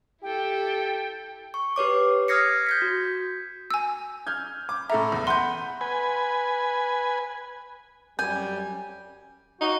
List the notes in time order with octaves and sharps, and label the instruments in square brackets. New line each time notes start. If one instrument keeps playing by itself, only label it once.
[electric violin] E4 A4 [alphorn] G4 [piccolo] G5
[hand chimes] C#6
G4 B4 C#5 D6
D#6 F6 G#6 A#6 C7 C#7
G6 G#6 B6
F#4
[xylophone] G#5 E6
[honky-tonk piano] F6 G6 G#6
D6
[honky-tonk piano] A2 A4 A#5 [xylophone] E5
[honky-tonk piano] E2
[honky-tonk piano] B4 F#5 B5 [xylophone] C6 G6
[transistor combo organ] B4 G#5
[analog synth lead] F#2 [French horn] G3 [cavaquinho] G#5 [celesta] G6
[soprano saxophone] D#4 [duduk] F#4